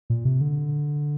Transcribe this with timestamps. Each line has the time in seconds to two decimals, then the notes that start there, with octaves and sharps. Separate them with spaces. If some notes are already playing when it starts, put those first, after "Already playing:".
0.10 A#2
0.25 C3
0.41 D3